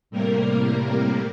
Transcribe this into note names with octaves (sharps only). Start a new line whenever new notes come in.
A2 C3 G3 A#3 A#4